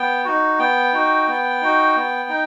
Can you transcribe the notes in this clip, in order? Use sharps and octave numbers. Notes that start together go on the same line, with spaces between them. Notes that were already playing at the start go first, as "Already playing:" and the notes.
Already playing: B3 G5
D#4 F#4
B3 G5
D#4 F#4
B3
D#4 F#4
B3
D#4